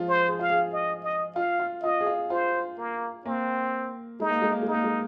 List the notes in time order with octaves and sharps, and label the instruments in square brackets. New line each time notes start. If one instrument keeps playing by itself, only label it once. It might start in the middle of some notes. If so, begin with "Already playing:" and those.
Already playing: [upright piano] F3 G#3 F4
[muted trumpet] C5
[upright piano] G#4
[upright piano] F4 [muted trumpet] F5
[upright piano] G#4
[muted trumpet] D#5
D#5
[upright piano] F4 [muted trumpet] F5
[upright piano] F4
[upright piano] F4 [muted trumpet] D#5
[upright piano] G#4
F4
[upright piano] F4 [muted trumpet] C5
[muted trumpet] A#3
[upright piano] A#3 [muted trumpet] C4
[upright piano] G#3 [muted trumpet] D#4
[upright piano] A#3
G#3
A#3
G#3
[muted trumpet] D#4
[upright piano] A#3
G#3